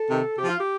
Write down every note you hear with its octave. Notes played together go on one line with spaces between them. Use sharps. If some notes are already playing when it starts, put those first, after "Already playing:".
Already playing: A4
C3 D#3
C3 F3 G4
F4
G4